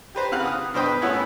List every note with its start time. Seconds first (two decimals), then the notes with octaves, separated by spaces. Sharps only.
0.15 G4 B4 C5 A#5
0.32 C#3 C4 B4 F5 F#5 F#6
0.44 F#5 D#6 F6
0.74 G2 B2 B4 C5 G5 D#6
0.86 B4
1.01 A2 B3 C#4 E4 F#5 G#5